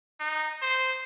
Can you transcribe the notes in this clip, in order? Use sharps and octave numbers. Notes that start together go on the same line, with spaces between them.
D#4
C5